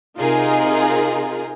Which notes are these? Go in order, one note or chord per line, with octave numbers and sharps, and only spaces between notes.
C3 D#4 F4 G#4 A#4